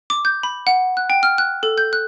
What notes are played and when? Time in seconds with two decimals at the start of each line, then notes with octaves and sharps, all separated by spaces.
0.10 D6
0.25 G6
0.43 B5
0.67 F#5
0.97 F#6
1.10 G5
1.23 F6
1.38 F#6
1.63 A4
1.78 G6
1.93 F#6